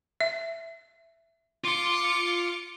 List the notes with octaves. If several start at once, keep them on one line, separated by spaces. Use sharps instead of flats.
E5
F4 C6 D6 C#7